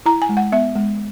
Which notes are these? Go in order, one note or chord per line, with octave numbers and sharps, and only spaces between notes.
E4 A#5
G#5
G#3
F#5
B3 E5
G#3